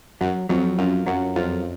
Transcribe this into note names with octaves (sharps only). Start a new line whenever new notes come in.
F#2 F#3
F2 F#3
F#2 F4
F#2 F#3
F2 F4